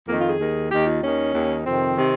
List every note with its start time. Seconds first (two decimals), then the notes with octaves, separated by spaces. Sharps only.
0.08 F2 D#3 A#3
0.19 F4
0.29 G#4
0.40 D#2 D#3
0.71 D#2 D#3 G4
0.86 F4
1.02 D#2 D#3 C#4
1.34 D#2 D#3
1.65 F2 C3 D#3 C4
1.97 C3 D#3